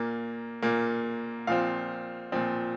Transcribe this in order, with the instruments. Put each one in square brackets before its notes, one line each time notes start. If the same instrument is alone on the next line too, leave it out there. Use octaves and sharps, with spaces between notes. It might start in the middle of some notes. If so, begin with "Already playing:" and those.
Already playing: [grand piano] A#2 A#3
A#2 A#3
A#2 F3 C4 F5
A#2 F3 C4